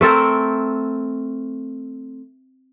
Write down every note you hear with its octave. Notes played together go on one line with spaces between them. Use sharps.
A3 C4 A4 A#4